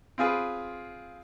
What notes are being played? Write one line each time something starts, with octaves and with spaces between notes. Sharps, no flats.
C4 F4 G#4 B4